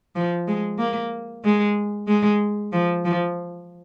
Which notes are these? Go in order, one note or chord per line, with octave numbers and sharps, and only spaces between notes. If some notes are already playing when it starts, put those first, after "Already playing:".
F3
G#3
A#3
G#3
G#3
F3
F3